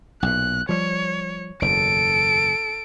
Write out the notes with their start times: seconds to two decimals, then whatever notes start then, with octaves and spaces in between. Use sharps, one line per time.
0.23 B1 A#2 F#6
0.69 F3 G3 C#5
1.62 F#1 E2 B2 A4 D7